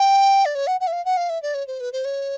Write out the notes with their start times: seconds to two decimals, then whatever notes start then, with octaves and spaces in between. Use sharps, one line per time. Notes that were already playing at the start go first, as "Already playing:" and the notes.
Already playing: G5
0.45 D5
0.55 C#5
0.67 F#5
0.80 F#5
0.87 E5
0.92 F5
1.05 F#5
1.17 F5
1.29 E5
1.42 D5
1.54 C#5
1.67 C5
1.80 B4
1.92 C5
2.05 C#5